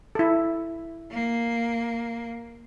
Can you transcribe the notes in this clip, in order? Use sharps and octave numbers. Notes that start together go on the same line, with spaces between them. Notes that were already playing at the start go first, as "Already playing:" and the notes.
E4 A4
A#3